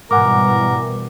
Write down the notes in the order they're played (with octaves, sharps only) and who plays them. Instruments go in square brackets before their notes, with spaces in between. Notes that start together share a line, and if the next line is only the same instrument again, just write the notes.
[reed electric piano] G#2 F#5 G#5 [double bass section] B2 E3 G3 [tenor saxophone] A#4 [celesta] D6